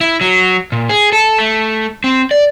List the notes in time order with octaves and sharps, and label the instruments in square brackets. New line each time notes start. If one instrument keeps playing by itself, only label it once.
[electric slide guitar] E4
F#3
A#2
G#4
A4
A3
C4
D5